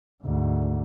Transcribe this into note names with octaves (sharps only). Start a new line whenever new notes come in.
D2 G#2